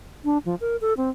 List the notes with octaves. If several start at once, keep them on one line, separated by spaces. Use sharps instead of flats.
D4
F3
A#4
A4
C4